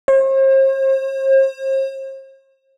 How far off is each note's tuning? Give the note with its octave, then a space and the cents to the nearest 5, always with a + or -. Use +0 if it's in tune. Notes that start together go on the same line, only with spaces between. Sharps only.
C5 +45